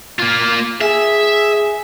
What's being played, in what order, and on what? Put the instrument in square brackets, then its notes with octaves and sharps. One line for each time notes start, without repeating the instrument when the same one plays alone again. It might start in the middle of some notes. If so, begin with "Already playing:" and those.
[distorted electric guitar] A#3 F4
[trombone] G#4 [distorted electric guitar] E5